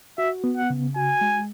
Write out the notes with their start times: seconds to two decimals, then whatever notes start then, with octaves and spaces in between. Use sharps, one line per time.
0.18 F#4 E5
0.44 B3
0.57 F#5
0.70 C#3
0.96 F#4 G#5
1.21 G#3